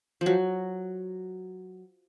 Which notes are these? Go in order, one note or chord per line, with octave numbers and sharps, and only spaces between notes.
F3
F#3